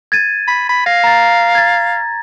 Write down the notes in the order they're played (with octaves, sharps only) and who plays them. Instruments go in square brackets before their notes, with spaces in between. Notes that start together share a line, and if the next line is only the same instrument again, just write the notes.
[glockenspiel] G#6 A6 D#7
[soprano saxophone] B5
B5
[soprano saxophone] F5 [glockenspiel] A#6
[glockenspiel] A#5 A6
G#6 A6